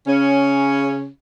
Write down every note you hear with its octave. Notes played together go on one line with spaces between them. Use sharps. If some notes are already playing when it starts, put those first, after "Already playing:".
C#3 C#4